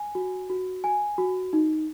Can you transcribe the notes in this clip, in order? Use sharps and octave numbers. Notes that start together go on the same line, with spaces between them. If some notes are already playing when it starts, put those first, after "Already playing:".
Already playing: G#5
F#4
F#4
G#5
F#4
D#4